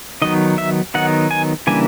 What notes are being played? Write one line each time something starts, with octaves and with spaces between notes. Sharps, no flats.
D#3 F#3 B3 D#4 D#5
E5
D#3 F#3 B3 D#4 F#5
G#5
C#3 E3 G3 A#3 D4 G#5